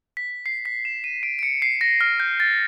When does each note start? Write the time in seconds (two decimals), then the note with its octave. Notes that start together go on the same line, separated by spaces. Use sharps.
0.17 B6
0.46 C7
0.65 B6
0.85 E7
1.04 D#7
1.23 D7
1.39 D7
1.43 C#7
1.62 C7
1.81 A#6
2.01 F6
2.20 G6
2.40 A6